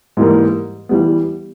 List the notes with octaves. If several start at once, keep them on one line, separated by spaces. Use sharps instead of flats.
G#2 E3 G3 A#3
E3 G3 B3